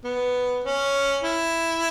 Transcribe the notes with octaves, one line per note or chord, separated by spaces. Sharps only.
B3
C#4
E4